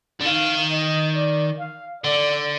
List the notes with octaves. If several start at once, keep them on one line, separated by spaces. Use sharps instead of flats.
D3
D#3 F5
D#5
D5
F5
D3 D5